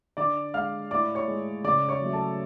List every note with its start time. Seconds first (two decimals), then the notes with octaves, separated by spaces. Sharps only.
0.17 D3 D5 D6
0.54 G#3 F5 F6
0.91 A2 D5 D6
1.15 C#5 C#6
1.28 G#3
1.64 C#3 D5 D6
1.89 C#5 C#6
2.01 F#3 A3
2.13 A4 A5